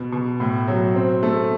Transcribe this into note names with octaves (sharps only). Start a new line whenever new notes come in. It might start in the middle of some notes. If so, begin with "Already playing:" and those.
Already playing: B2
B2
A2
F#3
C4
A3